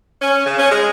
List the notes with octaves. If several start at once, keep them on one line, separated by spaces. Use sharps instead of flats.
C#4
C#3
C#4
G#3